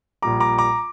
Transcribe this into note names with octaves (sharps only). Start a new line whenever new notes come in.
A#1 A#2 G3 A#5 D6
A#5 D6
A#5 D6